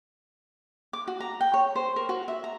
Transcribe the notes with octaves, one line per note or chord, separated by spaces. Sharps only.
D6
F#4
A#5
G5
C#5
C5
A#4
F#4
E5
A#5